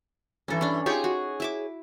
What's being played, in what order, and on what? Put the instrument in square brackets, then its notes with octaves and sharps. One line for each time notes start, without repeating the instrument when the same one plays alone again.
[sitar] G2 E3 [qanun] C#4 A4
[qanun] C#4 D4
[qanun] D#4 F4 G4 [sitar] G#4 C#5
[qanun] F#4
E4 E5 D6